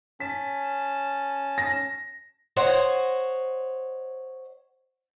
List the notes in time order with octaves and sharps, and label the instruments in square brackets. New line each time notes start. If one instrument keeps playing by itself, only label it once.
[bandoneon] C#4 A5 [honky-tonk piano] B6
[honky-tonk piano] A#6
[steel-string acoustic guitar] C5 C#5 D#5 F#5